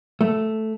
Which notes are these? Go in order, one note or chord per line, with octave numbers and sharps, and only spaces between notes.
A3